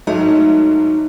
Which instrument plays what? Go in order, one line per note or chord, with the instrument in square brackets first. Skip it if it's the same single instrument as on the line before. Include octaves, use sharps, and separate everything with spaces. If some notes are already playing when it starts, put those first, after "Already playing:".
[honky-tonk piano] G#2 F#3 A3 [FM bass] D#4